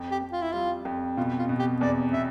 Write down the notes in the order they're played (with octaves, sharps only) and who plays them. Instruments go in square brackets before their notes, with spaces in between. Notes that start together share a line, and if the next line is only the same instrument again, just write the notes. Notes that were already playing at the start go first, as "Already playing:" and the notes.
Already playing: [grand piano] F2
[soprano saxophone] G4
[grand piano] F2
[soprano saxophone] F4
E4
[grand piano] G3 [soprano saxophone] F4
[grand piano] F2
[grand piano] B2 [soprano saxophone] F4
[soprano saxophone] F4
[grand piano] B2
[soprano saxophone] G4
[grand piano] E2 [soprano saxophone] D5
[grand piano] B2 [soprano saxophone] E5